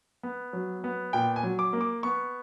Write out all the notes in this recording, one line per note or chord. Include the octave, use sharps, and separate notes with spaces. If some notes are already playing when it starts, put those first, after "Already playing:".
B3
F#3
B3
A#2 G5
G#5
F#3
D6
A#3
D6
B3 C#6